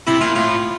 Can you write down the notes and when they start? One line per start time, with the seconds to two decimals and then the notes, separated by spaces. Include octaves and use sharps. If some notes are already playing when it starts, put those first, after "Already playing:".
0.07 C3 E4
0.21 A#2 F4
0.36 A2 F4